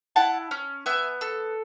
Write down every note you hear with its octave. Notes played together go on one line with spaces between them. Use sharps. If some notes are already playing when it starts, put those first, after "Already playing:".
E4 F#5 A5
C#4
B3 E5 G#5
A4